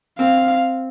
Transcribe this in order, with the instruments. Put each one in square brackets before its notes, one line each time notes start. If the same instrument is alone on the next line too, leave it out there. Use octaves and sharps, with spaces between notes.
[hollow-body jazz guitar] C4 [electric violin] F5